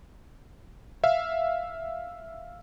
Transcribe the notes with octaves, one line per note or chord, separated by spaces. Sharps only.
E5 F5